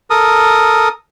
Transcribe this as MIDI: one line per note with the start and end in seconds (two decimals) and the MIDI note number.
0.10 0.89 69
0.10 0.89 70
0.10 0.89 87